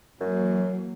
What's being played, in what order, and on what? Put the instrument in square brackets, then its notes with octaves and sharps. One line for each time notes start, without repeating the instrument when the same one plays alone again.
[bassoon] F#2 [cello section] E3 F#3 A#3